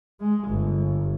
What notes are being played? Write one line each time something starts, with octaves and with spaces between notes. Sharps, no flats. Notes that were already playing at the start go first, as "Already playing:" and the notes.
G#3
G1